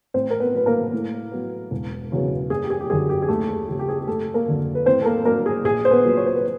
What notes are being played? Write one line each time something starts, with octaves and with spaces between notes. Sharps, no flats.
A1 C4 C5
A#4
B3 B4
A2 F#3 B4
A#3 A#4
A2
F#3 B3
E1
E2 C#3 F#3 B3
F#1 G#4
G4
G#4
G4
F#2 D3 G#4
G4
G#4
D#2 A3 A4
G#4
C#3 F3 G4
G4
G#4
G#4
F#1 A3 A4
A#3 A#4
F2 D3 F#3
B4
A2 C4 C5
A4
A#3 A#4
F#3 A#3 D4 A#4
G#4
A#1 G#4
C5
B3 B4
A#2 F#3 B3
C#5
C5
B4